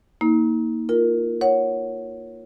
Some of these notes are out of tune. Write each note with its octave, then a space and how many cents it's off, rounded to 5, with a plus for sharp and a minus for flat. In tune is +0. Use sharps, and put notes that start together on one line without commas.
A#3 +0 D#4 +35
F4 +0 A#4 +0
C#5 -5 F#5 +0